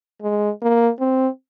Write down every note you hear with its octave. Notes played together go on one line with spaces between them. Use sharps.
G#3
A#3
C4